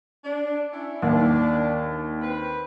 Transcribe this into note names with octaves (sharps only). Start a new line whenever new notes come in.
D4
C#4 D4 E4
D#2 D4
C4 B4